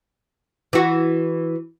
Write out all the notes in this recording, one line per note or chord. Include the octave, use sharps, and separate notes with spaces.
E3 F#4